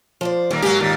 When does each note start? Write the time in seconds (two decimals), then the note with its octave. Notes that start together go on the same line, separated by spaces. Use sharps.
0.21 F3 C5 D5
0.51 D#2 G3 A#3
0.62 G#2 F#3 A#3 G4
0.80 D#2 A#2